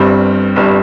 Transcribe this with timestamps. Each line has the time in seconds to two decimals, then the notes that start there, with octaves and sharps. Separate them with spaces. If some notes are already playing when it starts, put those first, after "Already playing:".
Already playing: G1 G2 G3 C4
0.56 G1 G2 G3